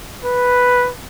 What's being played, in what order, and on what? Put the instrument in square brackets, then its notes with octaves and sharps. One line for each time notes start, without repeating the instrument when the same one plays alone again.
[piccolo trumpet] B4